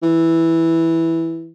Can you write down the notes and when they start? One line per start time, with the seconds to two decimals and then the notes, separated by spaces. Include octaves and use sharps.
0.02 E3